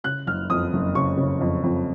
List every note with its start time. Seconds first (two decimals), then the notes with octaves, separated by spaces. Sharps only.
0.04 C#3 F#6
0.27 F#1 F6
0.50 F2 D#6
0.73 F#1
0.95 C#3 C#6
1.17 C#3
1.41 F2
1.63 F2